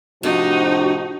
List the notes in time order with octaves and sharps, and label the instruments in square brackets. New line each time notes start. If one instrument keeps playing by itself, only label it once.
[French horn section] A2 C3 F3 [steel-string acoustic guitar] D4 [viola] D#4 [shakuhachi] F#4